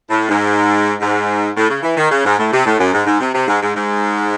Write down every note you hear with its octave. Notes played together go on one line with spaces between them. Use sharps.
A2
G#2
G#2
A2
C#3
E3
D#3
C#3
G#2
A2
C3
A2
F#2
G#2
G#2
C3
C3
G#2
G#2
G#2